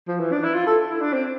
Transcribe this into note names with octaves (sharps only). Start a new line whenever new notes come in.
F3
E3
D4
E4
F4
A4
E4
D4
C4